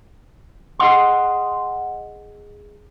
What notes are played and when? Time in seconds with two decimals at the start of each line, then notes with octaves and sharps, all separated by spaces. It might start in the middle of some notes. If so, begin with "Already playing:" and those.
0.80 G#4 D#5 F#5 C6